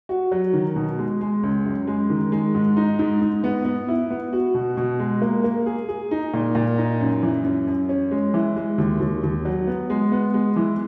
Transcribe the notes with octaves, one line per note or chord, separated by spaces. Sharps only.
F#4
F#3
D#3
B2
G#3
G#3
C#2
F#2
G#3
D#3
G#3
G#2
D#4
G#2
G#2
B3
B3
E4
B3
F#4
B2
B2
G#3
A#3
A#3
G#4
G#4
D#4
A#2
A#2
D#4
F#2
E3
F#2
F#2
C#4
G#3
E3
G#3
D#2
D#2
D#2
F#3
B3
G#3
B3
G#3
E3